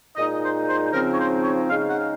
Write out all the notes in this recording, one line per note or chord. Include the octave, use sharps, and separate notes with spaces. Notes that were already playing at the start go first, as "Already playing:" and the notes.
A#2 G#3 D#4 D#5
C5
C5
C#3 F3 C4 D#4 A#4
C#5
C5
C#5
C#3 G#3 D#4 F5
F#5
F5